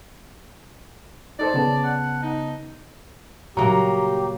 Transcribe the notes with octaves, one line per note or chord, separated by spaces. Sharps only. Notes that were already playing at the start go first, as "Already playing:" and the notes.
D#4 A4 C5 D5
C#3 B3 A5
F#5
D#4
A#2 C#3 F#3 G3 A#3 G4 A#5